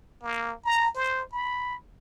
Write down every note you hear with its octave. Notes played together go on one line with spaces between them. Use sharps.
A#3
A#5
C5
B5